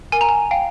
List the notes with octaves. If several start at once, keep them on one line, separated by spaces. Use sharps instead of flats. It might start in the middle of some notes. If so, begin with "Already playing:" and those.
A#4 G#5
A#5
G#5
F5 G5